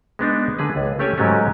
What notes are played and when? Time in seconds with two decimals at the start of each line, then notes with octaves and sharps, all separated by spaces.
0.19 G#3 B3 D4 D#4
0.59 D3 G#4 B4
0.76 C#2
0.99 A3 C#4 G4 C#5 D5 G#5
1.17 G#2 F#3 G#3 A3 C#4 G4